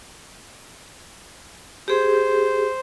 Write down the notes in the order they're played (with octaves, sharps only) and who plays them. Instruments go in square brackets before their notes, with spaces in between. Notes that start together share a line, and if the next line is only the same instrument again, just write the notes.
[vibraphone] G4 G#4 [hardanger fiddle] C5